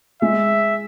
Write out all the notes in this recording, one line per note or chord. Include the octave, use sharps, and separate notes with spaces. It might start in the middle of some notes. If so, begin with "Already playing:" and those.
G#3 E5